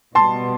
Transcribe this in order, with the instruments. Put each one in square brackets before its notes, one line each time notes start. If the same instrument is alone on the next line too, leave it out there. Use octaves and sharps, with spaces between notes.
[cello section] B2 G3 B3 [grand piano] A5 C6